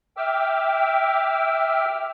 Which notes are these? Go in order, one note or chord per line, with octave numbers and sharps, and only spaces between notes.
E5 G5 D6 E6 F6